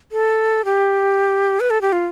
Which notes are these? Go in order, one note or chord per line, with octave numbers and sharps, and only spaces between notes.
A4
G4
B4
A4
G4
F4